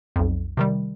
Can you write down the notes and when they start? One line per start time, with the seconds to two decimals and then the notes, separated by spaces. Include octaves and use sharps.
0.16 B1 F2
0.57 C3 D#3 G3